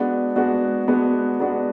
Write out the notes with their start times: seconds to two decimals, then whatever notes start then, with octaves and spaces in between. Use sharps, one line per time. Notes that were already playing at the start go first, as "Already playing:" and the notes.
Already playing: G#3 B3 D4 F#4
0.36 G#3 B3 D4 F#4
0.88 G#3 B3 D4 F#4
1.40 G#3 B3 D4 F#4